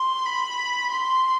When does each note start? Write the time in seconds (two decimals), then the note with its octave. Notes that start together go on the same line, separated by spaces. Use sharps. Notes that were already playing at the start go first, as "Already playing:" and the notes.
Already playing: C6
0.26 B5
0.91 C6